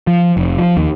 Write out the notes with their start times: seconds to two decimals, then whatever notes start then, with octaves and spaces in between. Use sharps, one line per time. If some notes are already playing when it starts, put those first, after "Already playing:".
0.07 F3
0.37 F1
0.58 F3
0.77 D#2